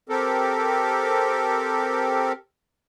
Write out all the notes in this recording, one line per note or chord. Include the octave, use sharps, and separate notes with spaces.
C4 G4 A4 A#4